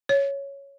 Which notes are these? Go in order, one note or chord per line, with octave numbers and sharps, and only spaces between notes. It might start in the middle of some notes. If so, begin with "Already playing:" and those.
C#5